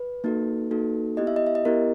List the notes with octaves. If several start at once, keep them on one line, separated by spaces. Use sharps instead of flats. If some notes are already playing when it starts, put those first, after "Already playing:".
Already playing: B4
A#3 D#4 F#4 A4
A#3 D#4 F#4 A4
B3 E4 G4 D#5
E5
D#5
E5
D#5
B3 E4 G4 A#4